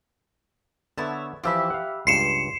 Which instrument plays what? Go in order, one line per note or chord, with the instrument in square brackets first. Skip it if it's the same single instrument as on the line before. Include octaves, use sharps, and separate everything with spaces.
[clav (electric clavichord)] D3 B3 [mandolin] E4 C#5 A5
[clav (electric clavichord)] E3 F3 F4 [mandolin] G4 E5 B5
[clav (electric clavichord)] F5 F#5
[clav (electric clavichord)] C#2 G2 [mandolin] C6 [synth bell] C7 C#7 E7